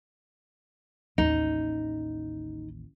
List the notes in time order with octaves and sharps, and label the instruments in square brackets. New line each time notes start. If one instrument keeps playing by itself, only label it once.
[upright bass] A1 D#2 [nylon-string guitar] D#4